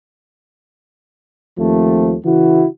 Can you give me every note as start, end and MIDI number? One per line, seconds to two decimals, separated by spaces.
1.59 2.15 39
1.59 2.15 53
1.59 2.15 57
1.59 2.15 60
2.25 2.66 49
2.25 2.66 52
2.25 2.66 64
2.25 2.66 66